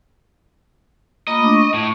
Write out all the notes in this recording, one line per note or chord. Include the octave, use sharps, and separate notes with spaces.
A#3 F4 D#5 B5
A3 D4
C#6
A2